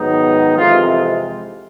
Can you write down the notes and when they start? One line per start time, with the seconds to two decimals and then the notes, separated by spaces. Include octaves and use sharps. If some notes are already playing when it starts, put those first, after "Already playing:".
Already playing: G#2 D#3 F#3 B3 D#4
0.56 F2 C3 E3 G#3 F4